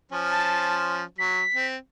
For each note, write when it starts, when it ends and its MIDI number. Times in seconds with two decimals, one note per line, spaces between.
0.12 1.03 53
0.12 1.03 61
0.12 1.03 72
0.31 0.85 81
1.18 1.43 54
1.18 1.66 95
1.55 1.76 60